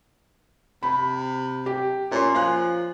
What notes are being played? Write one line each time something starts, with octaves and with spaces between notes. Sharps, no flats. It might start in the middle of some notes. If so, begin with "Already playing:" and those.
C3 B5
G4
A#2 C#4 C6
F3 F5 G#5 F#6